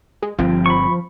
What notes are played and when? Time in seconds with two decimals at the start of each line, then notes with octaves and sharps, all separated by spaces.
0.22 G#3
0.39 G1 F3 C4
0.66 B5 C#6